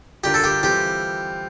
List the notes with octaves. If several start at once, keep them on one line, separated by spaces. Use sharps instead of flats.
D3 G3 D4 F4 G4 A#4
A4
G4
E3 G3 C4 F4 G4 A4